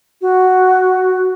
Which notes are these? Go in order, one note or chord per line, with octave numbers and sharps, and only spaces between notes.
F#4